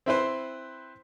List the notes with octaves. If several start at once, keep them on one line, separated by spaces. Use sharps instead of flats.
C4 E4 B4 C5